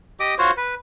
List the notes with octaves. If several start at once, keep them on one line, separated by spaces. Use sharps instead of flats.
G4 D#5 D6 D#6
F4 F#4 C5 C#5
B4